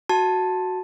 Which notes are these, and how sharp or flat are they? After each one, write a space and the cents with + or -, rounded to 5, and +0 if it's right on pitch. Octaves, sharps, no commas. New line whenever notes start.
F#4 +0 A5 +0